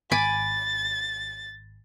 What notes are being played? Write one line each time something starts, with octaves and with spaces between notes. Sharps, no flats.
G#1 G#5 B5 D6 A6